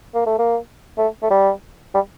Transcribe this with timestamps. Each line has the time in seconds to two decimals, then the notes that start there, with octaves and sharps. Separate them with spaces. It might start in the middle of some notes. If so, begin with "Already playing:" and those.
0.15 A#3
0.26 A3
0.39 A#3
0.98 A3
1.23 A3
1.31 G3
1.95 G3